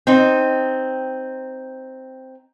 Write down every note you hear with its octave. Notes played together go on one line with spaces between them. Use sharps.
C4 D#4